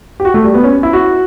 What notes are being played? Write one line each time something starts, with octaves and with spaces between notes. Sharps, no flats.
G4
F#4
A3
G3
B3
C#4
E4
F#4